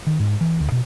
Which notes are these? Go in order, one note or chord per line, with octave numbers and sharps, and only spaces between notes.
D#3
G#2
E3
D2
B2